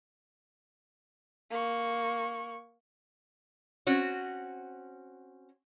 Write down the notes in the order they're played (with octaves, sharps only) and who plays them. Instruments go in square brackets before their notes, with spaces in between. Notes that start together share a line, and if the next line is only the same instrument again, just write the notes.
[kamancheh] A#3 C#6
[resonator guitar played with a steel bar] C4 C#4 F#4